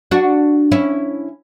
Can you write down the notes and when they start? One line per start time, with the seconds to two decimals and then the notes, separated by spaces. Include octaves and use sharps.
0.11 D4 F#4
0.72 C#4 E4